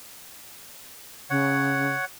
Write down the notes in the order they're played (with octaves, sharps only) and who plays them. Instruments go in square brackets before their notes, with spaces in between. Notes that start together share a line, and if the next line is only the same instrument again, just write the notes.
[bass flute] C#3 [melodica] C#5 F#5